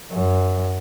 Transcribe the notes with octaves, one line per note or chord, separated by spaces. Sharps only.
F#2